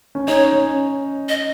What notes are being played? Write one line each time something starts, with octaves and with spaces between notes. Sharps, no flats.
C#4
D#4 C#5
C#4
D#5